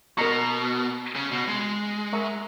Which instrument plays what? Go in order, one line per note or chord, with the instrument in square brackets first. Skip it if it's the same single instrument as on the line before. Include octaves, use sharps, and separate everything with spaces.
[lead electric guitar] B2 [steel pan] A#4 D#5 A#5 C#6
[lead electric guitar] C#3
B2
G#3
[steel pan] A#4 E5 A#5 C#6